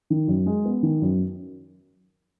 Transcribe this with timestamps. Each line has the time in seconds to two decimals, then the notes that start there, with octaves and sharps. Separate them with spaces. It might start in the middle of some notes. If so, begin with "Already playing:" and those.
0.10 D#3
0.28 F#2
0.46 G#3
0.65 B3
0.83 D#3
1.02 F#2